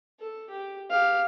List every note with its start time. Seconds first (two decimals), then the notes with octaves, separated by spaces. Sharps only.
0.20 A4
0.49 G4
0.90 G4 F5